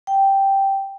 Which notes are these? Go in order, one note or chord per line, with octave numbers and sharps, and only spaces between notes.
G5